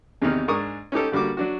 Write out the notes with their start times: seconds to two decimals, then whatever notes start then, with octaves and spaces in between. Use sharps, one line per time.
0.22 E2 C3 D#3 D#4 F6
0.48 G#2 D4 A#4 G#5 C#6 D#6
0.92 C#4 D#4 G4 A4
1.12 D3 G3 A#3 F#4 D6
1.37 F#3 D4 F#4